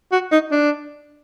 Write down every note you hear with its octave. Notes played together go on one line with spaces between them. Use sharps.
F#4
D#4
D4